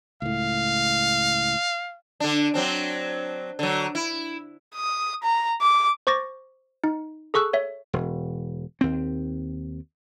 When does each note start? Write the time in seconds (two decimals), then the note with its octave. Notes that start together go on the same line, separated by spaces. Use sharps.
0.22 C#2 A2 F5
2.20 D3 D4
2.54 F#3 C4 D4
3.59 D3 F#3
3.95 E4
4.75 D#6
5.23 A#5
5.61 D6
6.07 C5 C#6 D6 A6 A#6
6.84 D#4
7.34 G#4 A4 C#6 E6 F#6
7.53 C#5 E5
7.93 E1
8.81 D#2 C4